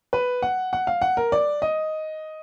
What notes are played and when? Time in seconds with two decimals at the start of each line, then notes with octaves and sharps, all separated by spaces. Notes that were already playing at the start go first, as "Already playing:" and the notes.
0.13 B4
0.42 F#5
0.73 F#5
0.87 F5
1.02 F#5
1.17 A#4
1.32 D5
1.62 D#5